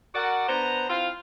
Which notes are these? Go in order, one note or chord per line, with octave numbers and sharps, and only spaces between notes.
F#4 A#4 D5 F#5
B3 D4 C5 A#5
C4 E4 F4 F5